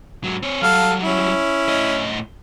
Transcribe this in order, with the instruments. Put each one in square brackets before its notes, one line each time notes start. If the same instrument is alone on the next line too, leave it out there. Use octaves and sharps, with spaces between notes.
[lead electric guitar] G#2 F#3
C4 C#5
[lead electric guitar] F#3 G3 [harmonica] A4 F5
[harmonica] C#4 E4
[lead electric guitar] A2 D#5